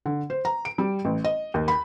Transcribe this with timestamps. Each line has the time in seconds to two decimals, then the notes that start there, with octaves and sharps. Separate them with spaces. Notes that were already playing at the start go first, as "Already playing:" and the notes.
0.06 D3
0.30 C5
0.45 A#5
0.65 D7
0.78 G3
1.05 A1
1.24 D#5
1.54 D#2
1.68 B5